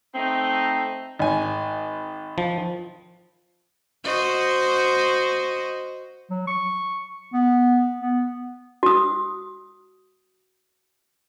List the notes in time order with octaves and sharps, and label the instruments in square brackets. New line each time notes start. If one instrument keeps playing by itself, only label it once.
[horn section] A3 C4 D#4
[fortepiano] G#1 G#5
[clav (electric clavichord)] F3
[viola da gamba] F#4 C5 D#5
[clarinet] F#3
C#6
B3
B3
[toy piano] F#4 D#6